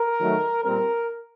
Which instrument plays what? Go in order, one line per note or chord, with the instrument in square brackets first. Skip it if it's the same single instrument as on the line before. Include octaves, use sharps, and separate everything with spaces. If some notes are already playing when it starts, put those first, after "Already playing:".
Already playing: [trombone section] A#4
D#3 F#3 A3
A#2 G3 C4 A#4